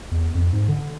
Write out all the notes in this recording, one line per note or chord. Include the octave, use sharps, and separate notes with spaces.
E2
F2
G#2
D3